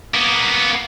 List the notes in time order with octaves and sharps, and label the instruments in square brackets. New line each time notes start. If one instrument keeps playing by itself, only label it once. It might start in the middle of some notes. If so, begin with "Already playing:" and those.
[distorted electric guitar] A#3 B3